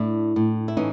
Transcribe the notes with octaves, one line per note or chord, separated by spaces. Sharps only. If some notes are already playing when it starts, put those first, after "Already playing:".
Already playing: A2 D4 E4
A2
E4
E3 C#4 D#4